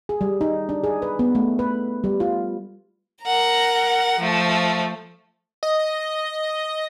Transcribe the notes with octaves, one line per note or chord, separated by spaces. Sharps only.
G#4
G3
D#4
D4
G#4
B4
B3
A3
B4
G3
F4
A#4 F#5 A#5
F3 A3
D#5